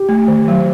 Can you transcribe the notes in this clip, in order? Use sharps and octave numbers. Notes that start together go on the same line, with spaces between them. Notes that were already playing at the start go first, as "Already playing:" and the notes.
Already playing: G4
A3
D#3
F#3